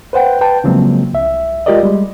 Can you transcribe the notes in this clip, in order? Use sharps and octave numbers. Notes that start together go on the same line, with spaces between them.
B4 C5 F#5 G5
B4 G5 A5
C#3 F3 F#3 G#3 A#3 C4
C2 E5
G#3 F4 G4 A#4 D5 D#5
G3 G#3